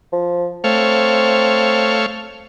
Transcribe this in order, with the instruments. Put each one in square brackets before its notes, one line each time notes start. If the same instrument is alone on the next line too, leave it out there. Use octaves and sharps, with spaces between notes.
[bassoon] F3
[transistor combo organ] A3 C#5 F5 [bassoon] C4